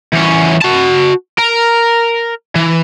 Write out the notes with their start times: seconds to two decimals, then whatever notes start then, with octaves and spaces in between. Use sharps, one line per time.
0.13 E2 C#4
0.62 F#4 A5
1.39 A#4
2.56 E3